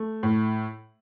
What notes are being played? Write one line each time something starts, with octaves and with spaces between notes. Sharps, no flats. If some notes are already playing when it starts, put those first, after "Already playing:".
Already playing: A3
A2